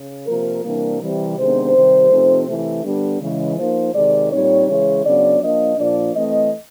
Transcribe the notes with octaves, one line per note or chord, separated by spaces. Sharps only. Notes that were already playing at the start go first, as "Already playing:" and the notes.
Already playing: C#3
C3 F3 A#3 A#4
C3 E3 G3 A#3 D4 A#4
C3 E3 G3
C3 D#3 G#3 B3 D4 C5
C3 D#3 G3
C3 F3 A3 C4 D#4
C3 E3 A3
D3 G3 B3 D4
C#3 E3 G#3
F3 A#3 D#4 C5
C3 D#3 G#3 D5
A#2 G3 C4 D#4 C#5
C#3 E3 G#3 C#5
C#3 F#3 B3 D4 D5
F3 A#3 D4 D#5
A#2 F3 A#3 D4 D5
E3 A3 C4 D#5